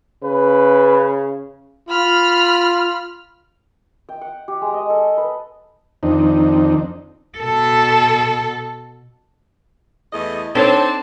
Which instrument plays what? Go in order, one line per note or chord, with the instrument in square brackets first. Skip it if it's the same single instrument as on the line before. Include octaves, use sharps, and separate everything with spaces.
[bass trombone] C#3 [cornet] B4
[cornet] F4 [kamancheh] B5 F6
[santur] G5
F#5
G4
G#3
D#5
A4
B4
[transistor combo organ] F2 D#3 C4 D4 D#4
[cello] B2 A4
[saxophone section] E2 A3 D#5
[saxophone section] C4 [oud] D4 [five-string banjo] D#4 A4 C#5 [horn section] A5